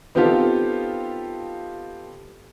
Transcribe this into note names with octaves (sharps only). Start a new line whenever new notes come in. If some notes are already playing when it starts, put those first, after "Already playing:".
B3 C4 D#4 F4 G4 A4